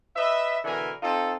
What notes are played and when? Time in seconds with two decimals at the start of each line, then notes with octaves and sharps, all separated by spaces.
0.16 B4 D#5 E5
0.65 B2 D3 E3 A#4 G#5
1.03 C4 D#4 F4 A4